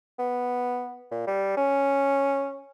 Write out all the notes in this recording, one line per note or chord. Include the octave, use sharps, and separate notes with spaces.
B3
A#2
G3
C#4